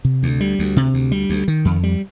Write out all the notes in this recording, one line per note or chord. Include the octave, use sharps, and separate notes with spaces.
C3
D2
G3
D2
C3
D2
G3
D2
D#3
F2
G3